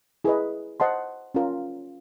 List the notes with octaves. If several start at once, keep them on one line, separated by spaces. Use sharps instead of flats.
E4 G#4 B4 D#5
C5 D#5 F#5 A5 C6
C#4 F4 A#4